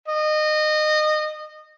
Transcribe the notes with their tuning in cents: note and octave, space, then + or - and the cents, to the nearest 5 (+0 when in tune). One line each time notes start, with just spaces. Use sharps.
D#5 -25